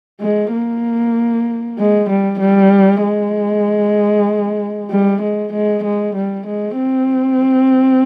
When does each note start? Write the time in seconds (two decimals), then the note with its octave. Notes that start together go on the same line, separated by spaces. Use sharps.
0.21 G#3
0.52 A#3
1.79 G#3
2.10 G3
2.40 G3
3.04 G#3
4.91 G3
5.22 G#3
5.53 G#3
5.84 G#3
6.16 G3
6.47 G#3
6.78 C4